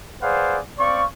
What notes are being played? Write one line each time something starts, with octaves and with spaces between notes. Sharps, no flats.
G#4 B4 C5 D5 F5 F#5
C4 D5 F5 C#6